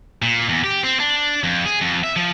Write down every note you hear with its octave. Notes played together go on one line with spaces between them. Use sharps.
A#2
E2
G4
C4
D4
F2
G#4
F2
E5
F3